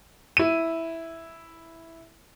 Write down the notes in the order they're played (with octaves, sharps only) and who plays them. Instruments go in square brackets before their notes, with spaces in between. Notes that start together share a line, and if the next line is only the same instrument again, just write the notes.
[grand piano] E4 D#7